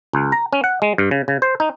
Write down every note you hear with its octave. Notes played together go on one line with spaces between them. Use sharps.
C#2
A#5
C#4
F#5
G#3
G2
C#3
C#3
C5
D#4